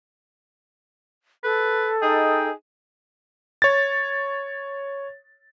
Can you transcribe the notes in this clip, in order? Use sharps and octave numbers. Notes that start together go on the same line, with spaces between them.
A4 B4
D#4 G#4 D#5 G5
C#5 A6